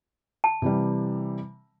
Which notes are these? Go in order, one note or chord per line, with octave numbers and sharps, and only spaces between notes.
A5
C3 E3 G3